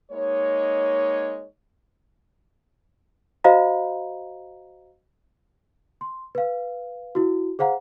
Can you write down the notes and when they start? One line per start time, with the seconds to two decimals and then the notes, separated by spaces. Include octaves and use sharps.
0.11 G#3 A#3 D#4 C#5
3.44 F#4 C5 D#5 F5 A#5
6.01 C6
6.35 B4 F5
7.15 E4 F#4
7.59 G#4 C5 F5 F#5 A#5